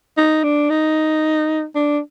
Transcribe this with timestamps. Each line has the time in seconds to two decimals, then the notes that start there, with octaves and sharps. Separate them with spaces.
0.17 D#4
0.43 D4
0.70 D#4
1.75 D4